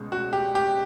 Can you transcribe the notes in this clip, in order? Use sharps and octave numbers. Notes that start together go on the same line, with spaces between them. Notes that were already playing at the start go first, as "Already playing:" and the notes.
Already playing: C#2 B2 G#3
F#4
G4
G4